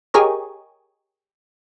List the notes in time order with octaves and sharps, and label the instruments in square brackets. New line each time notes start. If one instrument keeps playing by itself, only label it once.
[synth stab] G4 G#4 A#4 C#5 D#5